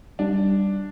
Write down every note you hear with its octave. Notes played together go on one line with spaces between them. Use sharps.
G3 D4